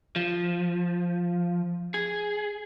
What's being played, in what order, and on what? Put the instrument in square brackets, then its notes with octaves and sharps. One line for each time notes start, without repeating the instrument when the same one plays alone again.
[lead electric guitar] F3
G#4